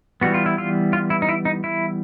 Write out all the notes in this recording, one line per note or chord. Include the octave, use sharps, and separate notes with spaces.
E3 G3 B3 F#4
F4
E4
F4
F4
E4
D#4
E4
D#4
E4